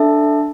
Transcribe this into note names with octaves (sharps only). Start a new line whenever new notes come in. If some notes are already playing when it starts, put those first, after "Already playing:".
Already playing: D4 A4 E5 A5